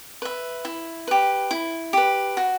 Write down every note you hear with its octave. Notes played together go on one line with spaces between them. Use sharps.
B4 E5
E4
G4 B4
E4
G4 B4
F#4